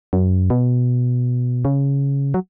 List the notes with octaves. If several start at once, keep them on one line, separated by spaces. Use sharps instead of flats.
F#2
B2
C#3
F#3